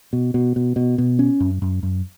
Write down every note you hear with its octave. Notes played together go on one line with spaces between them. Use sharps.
B2
B2
B2
B2
B2
C#4
F#2
F#2
F#2